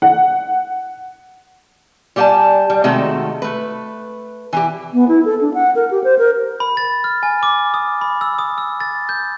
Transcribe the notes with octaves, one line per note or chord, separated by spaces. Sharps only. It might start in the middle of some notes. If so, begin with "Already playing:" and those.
F#5
G3 G4 C#5 F#5 G#5 A5
G3
C3 D#3 G#3 A3 F#4 A4
A3 B4
E3 E4 G4
B3
E4
A4
D4
F#5
A#4
G4
C5
A#4
B5
A6
F6
G#5
D6
D#6
B5
E6
D#6
E6
A6
G6